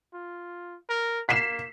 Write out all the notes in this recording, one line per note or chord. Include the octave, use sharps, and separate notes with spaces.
F4
A#4
A#3 B6 C7 E7